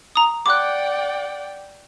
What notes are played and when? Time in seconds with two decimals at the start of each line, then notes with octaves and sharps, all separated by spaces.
0.16 A#5 D#6
0.46 D5 F#5 G5 D6 F#6